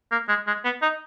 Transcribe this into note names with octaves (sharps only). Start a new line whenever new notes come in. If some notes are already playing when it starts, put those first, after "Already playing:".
A#3
G#3
G#3
B3
D#4